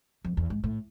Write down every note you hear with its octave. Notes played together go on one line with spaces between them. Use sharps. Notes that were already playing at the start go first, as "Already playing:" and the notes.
F2
E2
G#2
A2